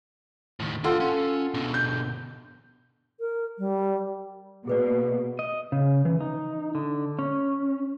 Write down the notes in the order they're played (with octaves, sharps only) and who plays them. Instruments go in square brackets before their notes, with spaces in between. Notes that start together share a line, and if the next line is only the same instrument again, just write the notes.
[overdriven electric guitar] A2 D#3
[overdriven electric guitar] D4 C6 [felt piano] F4 A4 F#5
[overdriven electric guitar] C#4
B2 D3
[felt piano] G6
[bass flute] A#4
G3
[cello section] B2 A#3 [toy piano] G#4 B4 D5
[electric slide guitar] D#5
C#3
E3
D#4
D3
C#4